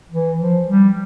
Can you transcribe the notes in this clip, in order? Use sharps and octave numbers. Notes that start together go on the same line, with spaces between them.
E3
F3
G3